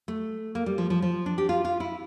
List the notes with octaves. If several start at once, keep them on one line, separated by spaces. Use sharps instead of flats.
A3
A#3
G3
F3
F3
F3
D4
G4
F4
F4
E4